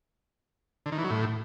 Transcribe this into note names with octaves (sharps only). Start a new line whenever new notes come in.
D3
D#3
E3
F#3
A2